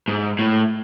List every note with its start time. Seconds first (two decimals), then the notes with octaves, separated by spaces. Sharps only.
0.08 G#2
0.39 A2